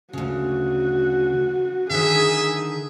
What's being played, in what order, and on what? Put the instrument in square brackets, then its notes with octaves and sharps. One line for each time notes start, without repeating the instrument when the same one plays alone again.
[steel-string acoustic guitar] D2 C#3 [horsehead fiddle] F#4
[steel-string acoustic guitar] D3 D#3 [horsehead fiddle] G#4 [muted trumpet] E5